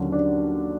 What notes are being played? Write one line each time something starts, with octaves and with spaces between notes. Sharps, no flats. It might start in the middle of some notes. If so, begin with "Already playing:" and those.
Already playing: D#2 D3 F#3 C#4
D4